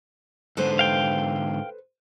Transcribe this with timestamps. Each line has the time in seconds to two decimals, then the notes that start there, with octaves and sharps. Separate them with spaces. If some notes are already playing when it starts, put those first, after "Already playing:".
0.57 G#2 D3 A4 B4 C5
0.79 F5 G5